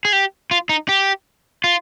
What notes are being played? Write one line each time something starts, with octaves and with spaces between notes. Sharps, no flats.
G#4
G4
F4
D#4
G4
F4